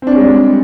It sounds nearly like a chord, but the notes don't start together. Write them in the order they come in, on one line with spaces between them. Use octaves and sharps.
C4 D4 C#5 G#3 G3